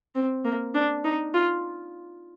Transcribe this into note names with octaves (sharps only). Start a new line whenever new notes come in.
C4
A#3
D4
D#4
F4